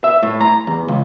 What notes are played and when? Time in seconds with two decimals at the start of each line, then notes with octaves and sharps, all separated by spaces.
0.04 E5
0.23 A2
0.41 A#5
0.67 E2
0.88 C#2